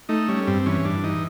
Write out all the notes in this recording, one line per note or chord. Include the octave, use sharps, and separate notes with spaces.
A3 D#4
G3 C#4
G2 C4
E3 C#4
G2 D4
E3 D#4